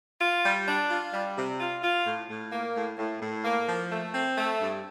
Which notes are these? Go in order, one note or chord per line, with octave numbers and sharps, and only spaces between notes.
F4
G3
D4
F4
G3
C3
F4
F4
A2
A2
A#3
A2
A2
A2
A#3
F3
A3
C4
A3
G2